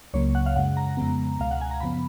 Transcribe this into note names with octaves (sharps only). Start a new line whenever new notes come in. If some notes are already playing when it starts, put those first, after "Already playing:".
C#2 C#3 F#3 A#3 C#5
F#5
F5
F#2 C#3 G#3 F#5
A#5
F2 C#3 G#3 B3
C#2 B2 G#3 F5
F#5
G#5
A#5
F#2 C#3 F3 B3 B5